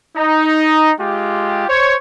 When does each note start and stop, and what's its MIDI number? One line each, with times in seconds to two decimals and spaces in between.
0.16 0.91 63
0.99 1.67 56
0.99 1.67 65
0.99 1.67 67
1.68 1.95 72
1.68 1.95 73